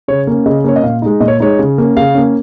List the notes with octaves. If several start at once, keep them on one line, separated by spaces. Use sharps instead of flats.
C#3 C#5
A#3 C#4
C#3 D#5
A#3 C#4 C#5
D#5
A#2 F5
G#3 D#4
A#2 D#5
C#5
G#3 D#4 C#5
C#3
A#3 C#4
C#3 F5
A#3 C#4